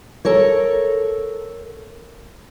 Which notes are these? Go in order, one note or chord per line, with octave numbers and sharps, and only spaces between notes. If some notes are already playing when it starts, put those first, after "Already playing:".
A4 A#4 C#5